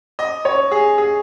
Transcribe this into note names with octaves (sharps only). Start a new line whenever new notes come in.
D#5
C#5
G#4
G#4